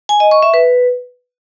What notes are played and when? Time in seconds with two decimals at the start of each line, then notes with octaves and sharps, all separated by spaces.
0.09 G#5
0.20 D#5
0.31 C#6
0.43 E5
0.54 B4